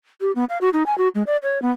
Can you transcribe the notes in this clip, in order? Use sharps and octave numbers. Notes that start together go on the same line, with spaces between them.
G4
B3
F5
F#4
D#4
G#5
F#4
G#3
D5
C#5
B3